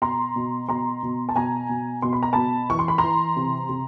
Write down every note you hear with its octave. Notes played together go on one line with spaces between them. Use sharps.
B2 A#5 C6
B2
B2 A#5 C6
B2
A5
B2 G#5 A#5
B2
B2 C6
B5
A#5
B2 A5 B5
E3 C#6
C6
B5
A#5 C6
E3
C3
C3